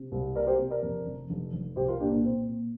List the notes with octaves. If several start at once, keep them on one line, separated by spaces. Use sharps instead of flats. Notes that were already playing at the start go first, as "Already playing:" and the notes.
Already playing: C3
C2
C3 A#4 D5
G4 C5
C3
A#4 D5
F2
F1
F1
F1
C2 G4 C5
F4 A#4
A#2 D4 G4
A#3 D4
A#2 C4
A#2